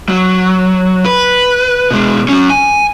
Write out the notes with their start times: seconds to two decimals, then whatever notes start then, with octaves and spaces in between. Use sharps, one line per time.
0.09 F#3
1.05 B4
1.91 B2 G#3
2.29 F#3 C#4
2.50 G#5